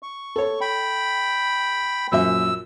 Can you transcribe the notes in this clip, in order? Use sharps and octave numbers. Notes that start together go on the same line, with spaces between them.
C#6
A4 C#5
G5 B5
A#1 F#2 E5 E6